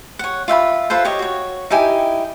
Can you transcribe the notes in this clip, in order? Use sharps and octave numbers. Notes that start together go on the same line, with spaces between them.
C#5 F#5
F4 E5 G5 B5
F4 A4 B4 C5
G4 C#5 D#5
F#4 C#5
D#4 E4 G4 G#5